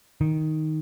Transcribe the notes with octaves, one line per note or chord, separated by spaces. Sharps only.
D#3